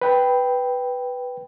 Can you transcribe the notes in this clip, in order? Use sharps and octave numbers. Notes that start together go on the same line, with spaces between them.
B4 G5